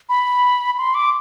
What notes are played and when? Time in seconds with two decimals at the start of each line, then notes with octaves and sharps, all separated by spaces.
0.09 B5
0.78 C6
0.94 D6